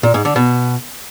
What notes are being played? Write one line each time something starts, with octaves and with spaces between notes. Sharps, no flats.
A#2
G#2
D3
B2